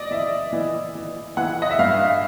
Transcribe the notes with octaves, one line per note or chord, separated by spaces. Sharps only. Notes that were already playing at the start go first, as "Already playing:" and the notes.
Already playing: D5 D#5
E3 E5
E3
E3
E3 F#5
D#5
E5
G2 F5